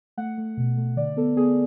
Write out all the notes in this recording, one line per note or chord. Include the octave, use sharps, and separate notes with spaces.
A3 F#5
A3
B2
A3
D3 D5
B3 A4
B3 G#4